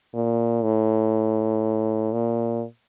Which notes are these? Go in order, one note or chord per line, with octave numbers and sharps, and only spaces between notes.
A#2
A2
A#2